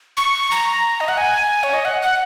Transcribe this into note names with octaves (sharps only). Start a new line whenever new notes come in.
C#6
A#5
D#5
F#5
G#5
C#5
D#5
F#5
F#5